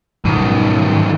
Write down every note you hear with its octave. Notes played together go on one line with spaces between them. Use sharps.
B1 G#2 B2 D#3 G3